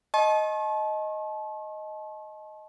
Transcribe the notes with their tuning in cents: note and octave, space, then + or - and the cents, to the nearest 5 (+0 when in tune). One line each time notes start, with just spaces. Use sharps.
D#5 +5 A5 -35 C#6 -45